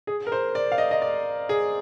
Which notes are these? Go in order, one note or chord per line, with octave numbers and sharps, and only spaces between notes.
G#4
A#4
C5
D5
F5
D#5
D#5
D5
G#4